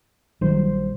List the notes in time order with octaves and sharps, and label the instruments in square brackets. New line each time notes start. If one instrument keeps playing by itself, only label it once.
[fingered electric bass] A#1 G3 [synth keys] D#3 F#3 C5